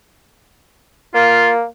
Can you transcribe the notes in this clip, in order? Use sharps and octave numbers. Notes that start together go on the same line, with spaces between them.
A#3 F4